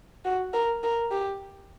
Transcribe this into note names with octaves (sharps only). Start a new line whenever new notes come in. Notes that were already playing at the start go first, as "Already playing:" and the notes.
F#4
A#4
A#4
G4